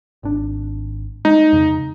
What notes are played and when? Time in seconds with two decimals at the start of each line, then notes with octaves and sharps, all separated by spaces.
0.23 G#1 D4
1.25 G#3 D#4
1.52 F2 C#3